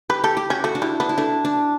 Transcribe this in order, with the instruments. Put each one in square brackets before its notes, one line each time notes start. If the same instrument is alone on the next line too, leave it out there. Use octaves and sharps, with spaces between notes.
[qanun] G4 [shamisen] B4
[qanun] G4 [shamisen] A4
[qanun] G4
[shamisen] C#4 [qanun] F#4
[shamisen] A3 [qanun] F#4
[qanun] D4
[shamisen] G3 [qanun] E4
[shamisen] B3 [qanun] D4
[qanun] E4
[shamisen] A3 [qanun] D4
[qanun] D4